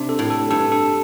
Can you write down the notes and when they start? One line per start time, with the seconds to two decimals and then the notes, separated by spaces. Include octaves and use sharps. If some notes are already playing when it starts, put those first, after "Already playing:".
Already playing: C3 D4
0.09 A4
0.19 A2
0.30 A4
0.51 G2 A4
0.72 A4